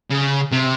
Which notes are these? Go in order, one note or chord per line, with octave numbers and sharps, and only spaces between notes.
C#3
C3